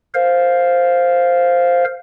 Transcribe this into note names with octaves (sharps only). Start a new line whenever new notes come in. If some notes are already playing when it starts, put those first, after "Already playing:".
A#4 C5 F5